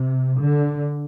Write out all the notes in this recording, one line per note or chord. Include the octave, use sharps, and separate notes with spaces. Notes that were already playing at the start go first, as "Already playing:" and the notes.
Already playing: C3
D3